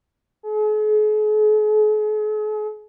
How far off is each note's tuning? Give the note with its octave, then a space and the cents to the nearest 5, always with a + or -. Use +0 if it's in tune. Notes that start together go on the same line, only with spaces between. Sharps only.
G#4 +45